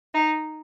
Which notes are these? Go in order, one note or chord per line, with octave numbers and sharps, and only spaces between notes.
D#4